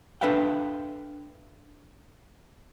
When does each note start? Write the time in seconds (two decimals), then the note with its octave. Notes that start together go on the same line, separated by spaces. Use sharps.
0.21 D4 A4 B4 E5 F5 G5